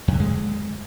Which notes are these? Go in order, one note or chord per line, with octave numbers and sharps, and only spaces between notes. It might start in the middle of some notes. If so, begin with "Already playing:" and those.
F2
D3
G#3